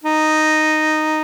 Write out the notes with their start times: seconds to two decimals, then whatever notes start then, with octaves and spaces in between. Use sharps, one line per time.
0.04 D#4